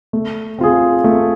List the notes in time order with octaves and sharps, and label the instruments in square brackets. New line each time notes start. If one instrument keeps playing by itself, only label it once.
[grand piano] A3
C4 F4 G#4
A3